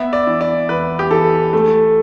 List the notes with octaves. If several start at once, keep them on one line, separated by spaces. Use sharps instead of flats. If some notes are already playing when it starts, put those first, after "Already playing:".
Already playing: B3 E5
D5
E3
D5
E2 B4
G4
E3 A4
A3